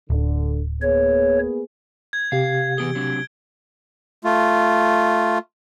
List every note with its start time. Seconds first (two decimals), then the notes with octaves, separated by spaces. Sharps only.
0.10 D1 D3
0.82 A#3 B3 G#4 C#5
2.13 G#6
2.32 C3 G4 F5
2.78 E3 B3 G#4 D7 G7
2.95 F#3 C4 D4
4.24 A3 F4